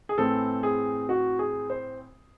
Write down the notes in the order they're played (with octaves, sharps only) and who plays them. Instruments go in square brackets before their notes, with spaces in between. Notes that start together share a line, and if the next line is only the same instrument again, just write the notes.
[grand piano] G#4
A2 E3 C4 A4
G#4
F#4
G#4
C5